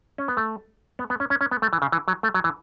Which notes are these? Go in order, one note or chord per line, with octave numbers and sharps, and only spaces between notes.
C#4
B3
A3
B3
B3
C#4
C#4
C#4
B3
A3
E3
C#3
E3
F#3
A3
F#3
E3